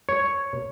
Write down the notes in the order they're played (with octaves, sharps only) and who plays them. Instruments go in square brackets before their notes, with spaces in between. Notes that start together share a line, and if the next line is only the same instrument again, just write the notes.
[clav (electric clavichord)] C#5